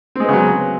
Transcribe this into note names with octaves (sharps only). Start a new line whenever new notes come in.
C#3 F#3 G#3 B3 C4